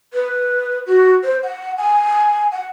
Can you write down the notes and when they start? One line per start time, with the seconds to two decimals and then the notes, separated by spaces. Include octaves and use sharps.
0.13 B4
0.86 F#4
1.23 C5
1.43 F#5
1.78 G#5
2.52 F#5